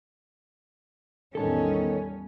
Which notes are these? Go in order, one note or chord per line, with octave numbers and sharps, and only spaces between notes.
A1 E2 D#3 G3 B3 C#4 A4 A5